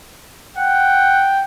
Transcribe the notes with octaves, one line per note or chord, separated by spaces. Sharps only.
F#5 G5